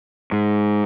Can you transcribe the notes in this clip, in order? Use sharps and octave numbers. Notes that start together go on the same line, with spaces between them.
G#2